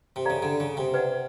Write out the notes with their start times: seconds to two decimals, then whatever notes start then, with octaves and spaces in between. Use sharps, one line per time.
0.16 C3
0.25 C#3 A4 D5 F5 A#5
0.42 D3
0.60 C#3
0.77 C3
0.94 B4 D5 F#5